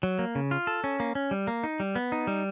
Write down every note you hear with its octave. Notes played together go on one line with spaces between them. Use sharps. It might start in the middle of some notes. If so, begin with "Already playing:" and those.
F#3
A#3
C#3
F4
A4
C#4
A#3
C#4
G3
A#3
D#4
G3
B3
D#4
G3